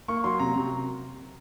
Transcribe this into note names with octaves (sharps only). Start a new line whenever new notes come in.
A#3 C#6
F#3 C6
C3 A#5
C3